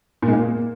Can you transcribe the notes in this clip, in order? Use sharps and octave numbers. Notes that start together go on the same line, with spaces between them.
A#2
G#3
A#3